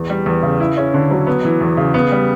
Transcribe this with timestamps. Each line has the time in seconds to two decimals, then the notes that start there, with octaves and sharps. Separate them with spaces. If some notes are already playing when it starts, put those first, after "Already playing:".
Already playing: E2
0.10 G3
0.26 E2
0.43 C#3
0.60 E4
0.77 C#4
0.94 D3
1.11 F#3
1.27 B3
1.45 E3
1.61 E2
1.77 C#3
1.94 B3
2.12 G3